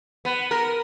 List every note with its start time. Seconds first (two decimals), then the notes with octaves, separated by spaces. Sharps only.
0.25 B3
0.51 A#4